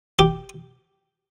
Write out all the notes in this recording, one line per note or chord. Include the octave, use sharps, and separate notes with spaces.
G4